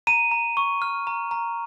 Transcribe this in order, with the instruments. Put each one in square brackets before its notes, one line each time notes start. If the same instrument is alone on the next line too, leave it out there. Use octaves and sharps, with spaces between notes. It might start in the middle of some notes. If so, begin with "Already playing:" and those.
[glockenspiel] A#5 D#7
A#5
C#6
F6
A#5
A#5